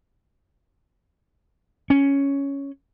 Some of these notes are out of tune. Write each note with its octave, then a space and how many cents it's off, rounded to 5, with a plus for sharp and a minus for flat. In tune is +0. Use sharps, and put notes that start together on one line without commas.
C#4 +5